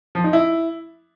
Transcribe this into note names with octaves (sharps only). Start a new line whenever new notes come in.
F3
D#4
E4